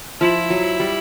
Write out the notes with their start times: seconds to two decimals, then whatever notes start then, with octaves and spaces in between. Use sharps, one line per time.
0.20 F3 E4
0.50 F#3
0.80 G3